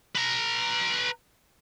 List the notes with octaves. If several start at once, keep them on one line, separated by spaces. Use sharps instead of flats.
B4 A#5